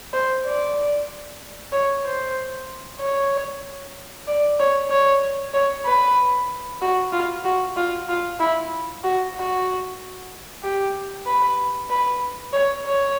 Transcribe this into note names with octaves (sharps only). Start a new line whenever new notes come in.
C5
D5
C#5
C5
C#5
D5
C#5
C#5
C#5
B4
F#4
F4
F#4
F4
F4
E4
F#4
F#4
G4
B4
B4
C#5
C#5